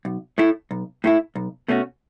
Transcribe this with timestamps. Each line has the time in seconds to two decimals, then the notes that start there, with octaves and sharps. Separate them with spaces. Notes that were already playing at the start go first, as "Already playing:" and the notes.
0.05 B1
0.38 A2 A3 E4
0.71 B1
1.04 A2 A3 E4
1.35 B1
1.68 B2 A3 C#4 F#4